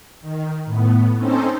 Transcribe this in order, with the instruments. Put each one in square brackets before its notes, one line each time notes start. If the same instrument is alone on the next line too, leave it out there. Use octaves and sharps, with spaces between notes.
[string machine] D#3
A2 B3
C4 C#4 D#4 A4 C5